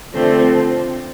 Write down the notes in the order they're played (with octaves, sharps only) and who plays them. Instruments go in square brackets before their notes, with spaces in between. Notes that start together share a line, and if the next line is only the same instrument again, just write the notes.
[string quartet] D3 F3 A3 C4